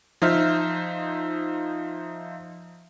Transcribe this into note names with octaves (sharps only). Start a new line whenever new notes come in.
F3 D#4 C5 E5 F6